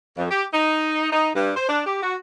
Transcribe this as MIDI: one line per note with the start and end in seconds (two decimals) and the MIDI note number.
0.17 0.27 41
0.31 0.45 67
0.54 1.08 63
1.12 1.30 63
1.36 1.51 43
1.56 1.66 72
1.69 1.85 62
1.86 2.00 67
2.03 2.15 66